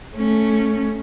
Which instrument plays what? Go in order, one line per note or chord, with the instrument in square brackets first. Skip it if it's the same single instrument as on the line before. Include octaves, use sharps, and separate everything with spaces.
[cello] A3 C#4